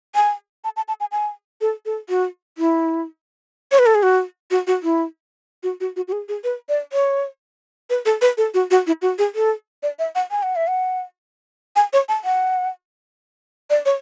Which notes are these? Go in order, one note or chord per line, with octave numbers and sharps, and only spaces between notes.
G#5
A5
A5
A5
G#5
G#5
A4
A4
F#4
E4
C#5
B4
A4
G#4
F#4
F#4
F#4
E4
F#4
F#4
F#4
F#4
G#4
G#4
B4
D5
C#5
B4
A4
B4
A4
F#4
F#4
E4
F#4
G#4
A4
D5
E5
F#5
G#5
F#5
E5
F#5
G#5
C#5
A5
F#5
D5
C#5